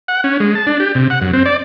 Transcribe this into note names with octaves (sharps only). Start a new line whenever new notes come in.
F#5
C#4
G#3
A5
D4
G4
C3
F#5
F#2
C4
D5